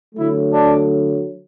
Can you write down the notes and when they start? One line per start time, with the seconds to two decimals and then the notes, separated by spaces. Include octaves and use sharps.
0.15 D3 F#3 A3 E4
0.51 D4